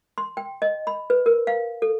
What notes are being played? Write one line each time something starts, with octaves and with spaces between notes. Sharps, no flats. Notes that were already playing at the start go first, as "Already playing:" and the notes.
C6
G5
D#5
B5
B4
A#4
F5
A4